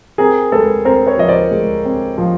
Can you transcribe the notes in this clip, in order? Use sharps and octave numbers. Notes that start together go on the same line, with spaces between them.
C4 G#4 A#4
G#3 A4 B4
C4 A#4 C5
B4 C#5
F3 D#5
C5 D5
G#3
C4
F3